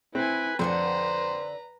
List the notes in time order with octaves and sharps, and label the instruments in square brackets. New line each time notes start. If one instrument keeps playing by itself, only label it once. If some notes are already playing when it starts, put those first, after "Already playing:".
[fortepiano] C4 [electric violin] E4 G#5 [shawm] B4
[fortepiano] F2 [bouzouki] D3 D4 F#5 [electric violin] B4 A#5 [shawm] C5